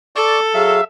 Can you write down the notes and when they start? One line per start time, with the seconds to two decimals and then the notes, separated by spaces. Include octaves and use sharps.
0.16 A4 D5 C#6 D6
0.54 F#3 G#4 E5 F5